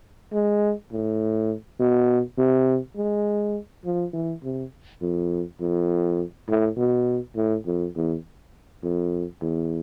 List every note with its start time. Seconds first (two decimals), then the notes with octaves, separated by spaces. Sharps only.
0.33 G#3
0.92 A2
1.80 B2
2.38 C3
2.97 G#3
3.85 F3
4.13 E3
4.43 C3
5.01 F2
5.60 F2
6.49 A2
6.77 B2
7.36 A2
7.66 F2
7.96 E2
8.83 F2
9.41 E2